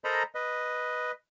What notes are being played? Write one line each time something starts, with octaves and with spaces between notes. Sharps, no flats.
A4 A#4 C5 D#5 A#5 B5
B4 D#5